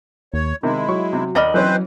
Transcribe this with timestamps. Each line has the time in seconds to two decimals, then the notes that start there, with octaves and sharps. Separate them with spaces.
0.34 D#2 C#5
0.63 C3 D#3 G#3 E4
0.89 F#3 C#6
1.13 C3
1.35 D#2 D5 D#5 B5 F6
1.54 E3 F#3 C4 C#4 B4 C5